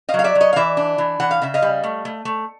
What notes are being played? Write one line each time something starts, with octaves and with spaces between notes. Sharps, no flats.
D#5 F5
F#3
F5
D5 E5
F#3
C#5 D#5
F5
E3 D5 E5
D4
E3
E3 F#5
F5
C#3 E5
D#5 F5
G3
A3
A3
A3